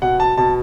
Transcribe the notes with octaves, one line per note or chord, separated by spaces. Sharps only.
B2 F#5
A5
B2 A5